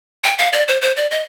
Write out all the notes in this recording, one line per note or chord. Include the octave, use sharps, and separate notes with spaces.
G5
F5
D5
C5
C5
D5
D#5